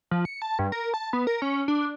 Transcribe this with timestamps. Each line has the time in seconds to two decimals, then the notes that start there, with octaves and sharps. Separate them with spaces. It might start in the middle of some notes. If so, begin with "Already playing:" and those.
0.11 F3
0.25 C#7
0.42 A5
0.59 G2
0.72 A#4
0.94 A5
1.13 B3
1.27 A#4
1.42 C#4
1.68 D4